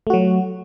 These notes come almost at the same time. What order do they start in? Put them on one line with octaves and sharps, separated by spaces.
A3 F#4 F#3